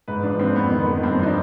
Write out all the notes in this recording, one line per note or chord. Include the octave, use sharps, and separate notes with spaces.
G#2 B4
F3 D4
F3 C4
F2 B3
D#3
B3
D#3
G2 C4
F3 D#4
D4